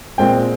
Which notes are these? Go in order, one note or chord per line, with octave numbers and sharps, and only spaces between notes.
A#2 G#3 C4 G5